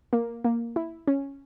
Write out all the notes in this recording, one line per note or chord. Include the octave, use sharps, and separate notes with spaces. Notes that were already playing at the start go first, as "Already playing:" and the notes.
A#3
A#3
E4
C#4